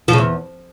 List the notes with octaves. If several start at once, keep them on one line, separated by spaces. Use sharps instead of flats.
F3
C#3
E2